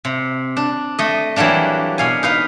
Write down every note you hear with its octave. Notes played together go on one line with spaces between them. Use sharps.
C3
D4
A3 D#5
E3 F#3 G3 A#3 D4
B2 F5 G#5
D#4 B4 F5